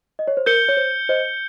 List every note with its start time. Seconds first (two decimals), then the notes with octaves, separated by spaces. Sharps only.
0.19 D#5
0.27 C#5
0.37 C5
0.46 A#4 G6 C#7 G7
0.69 C#5
0.77 C5
1.09 C5 D#5